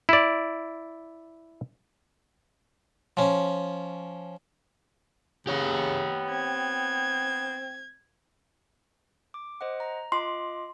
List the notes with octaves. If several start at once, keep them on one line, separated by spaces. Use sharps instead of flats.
E4 D5
F3 C#4
C#3 B3 G4 C#5
C4 G#6
D6
C5 D#5 F#5
A#5
F4 D#5 C6 D6